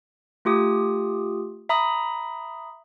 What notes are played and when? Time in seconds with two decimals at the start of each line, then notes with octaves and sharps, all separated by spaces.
0.45 A3 F4 G4 D#6
1.69 E5 A#5 B5 D#6